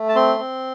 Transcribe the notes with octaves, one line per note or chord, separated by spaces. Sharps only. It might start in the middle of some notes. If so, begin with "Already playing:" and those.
Already playing: A3
A5
C4 C6
C4